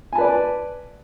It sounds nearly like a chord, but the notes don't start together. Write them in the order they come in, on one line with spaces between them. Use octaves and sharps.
G#5 A5 B4 D5